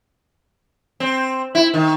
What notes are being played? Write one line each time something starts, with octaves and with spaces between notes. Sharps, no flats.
C4
E4
D#3